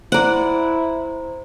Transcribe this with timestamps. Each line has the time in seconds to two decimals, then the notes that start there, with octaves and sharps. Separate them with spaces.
0.12 E4 C5 D5 F#5 A#5